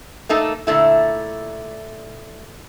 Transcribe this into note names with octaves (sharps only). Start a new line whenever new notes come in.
A3 A#3 D#4 A4
A#2 D3 A3 E4